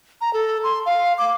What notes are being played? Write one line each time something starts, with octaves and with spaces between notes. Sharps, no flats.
A#5
A4
C6
F5
D6